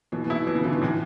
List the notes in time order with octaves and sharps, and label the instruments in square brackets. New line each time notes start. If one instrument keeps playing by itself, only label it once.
[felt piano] B2 [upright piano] E3
[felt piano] B2
[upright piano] E4
[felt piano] B2
[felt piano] B2 [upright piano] E3
[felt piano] C#3
[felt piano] D3 [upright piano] E3
[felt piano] B2
[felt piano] A2 [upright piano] E3